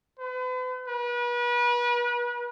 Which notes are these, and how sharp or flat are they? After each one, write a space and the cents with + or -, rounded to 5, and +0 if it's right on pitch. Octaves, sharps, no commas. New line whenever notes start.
B4 +40
B4 -35